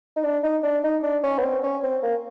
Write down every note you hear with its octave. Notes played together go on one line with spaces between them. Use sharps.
D#4
D4
D#4
D4
D#4
D4
C#4
B3
C4
C#4
C4
A#3